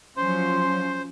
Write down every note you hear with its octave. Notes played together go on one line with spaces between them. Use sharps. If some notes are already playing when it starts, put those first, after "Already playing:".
F3 F#3 C#4 C5 C6